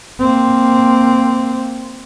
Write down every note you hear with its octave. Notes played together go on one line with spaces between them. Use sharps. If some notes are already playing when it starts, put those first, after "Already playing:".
A#3 C4